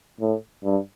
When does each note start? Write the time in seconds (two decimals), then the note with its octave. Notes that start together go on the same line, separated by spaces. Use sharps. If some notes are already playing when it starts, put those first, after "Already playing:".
0.21 A2
0.64 G2